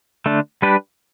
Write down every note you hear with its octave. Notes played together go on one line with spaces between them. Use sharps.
D3 A3 D4
G3 D4 G4 B4